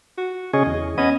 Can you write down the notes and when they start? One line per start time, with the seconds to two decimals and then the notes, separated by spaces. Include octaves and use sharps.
0.18 F#4
0.53 C#3 C#4 G#4 D#5
0.66 E2
0.98 B3 C#4 D#5